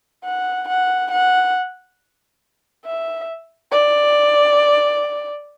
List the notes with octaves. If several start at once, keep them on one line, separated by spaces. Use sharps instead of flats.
F#5
F#5
F#5
E5
D5